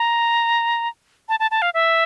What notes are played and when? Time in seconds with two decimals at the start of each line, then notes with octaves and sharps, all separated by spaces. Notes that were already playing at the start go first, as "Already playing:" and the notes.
Already playing: A#5
1.29 A5
1.40 A5
1.51 A5
1.62 F5
1.74 E5